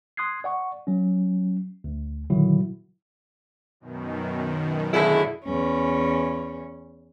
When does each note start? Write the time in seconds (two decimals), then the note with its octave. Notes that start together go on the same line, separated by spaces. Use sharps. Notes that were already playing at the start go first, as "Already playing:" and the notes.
0.17 C6 D#6 F#6 G#6 C7
0.44 D5 F#5 C#6
0.87 F#3 C#4
1.84 D2
2.30 A#2 D3 D#3 F#3 E4 F#4
3.80 F#2 B2 D#3
4.94 A2 D3 E4 G#4 E5
5.44 E2 C#4